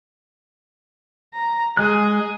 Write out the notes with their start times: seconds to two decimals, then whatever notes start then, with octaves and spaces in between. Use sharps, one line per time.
1.34 A#5
1.77 G#3 G#4 F#6